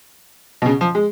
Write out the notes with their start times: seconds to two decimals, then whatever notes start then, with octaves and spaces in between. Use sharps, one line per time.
0.62 B2
0.66 C#3
0.81 F3
0.95 G#3